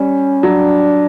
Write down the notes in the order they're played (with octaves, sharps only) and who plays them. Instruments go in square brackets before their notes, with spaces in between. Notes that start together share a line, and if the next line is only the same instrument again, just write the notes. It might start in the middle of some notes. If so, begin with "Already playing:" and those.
Already playing: [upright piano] G3 [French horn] C#4
[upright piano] F#3 [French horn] D4